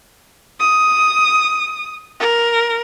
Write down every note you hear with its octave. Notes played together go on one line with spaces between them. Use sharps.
D#6
A#4